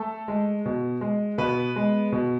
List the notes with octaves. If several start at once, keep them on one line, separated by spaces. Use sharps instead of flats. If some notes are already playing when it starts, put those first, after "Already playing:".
Already playing: A3 A4
G#3
B2
G#3
B2 B3 B4
G#3
B2